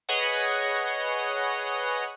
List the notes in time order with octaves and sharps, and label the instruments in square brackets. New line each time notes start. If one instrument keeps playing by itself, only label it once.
[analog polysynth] G#4 B4 C#5 D#5 F#5